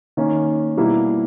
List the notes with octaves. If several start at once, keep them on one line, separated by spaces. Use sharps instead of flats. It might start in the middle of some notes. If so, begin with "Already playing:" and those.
D#3 A#3 C#4
B2 G3 A#3 E4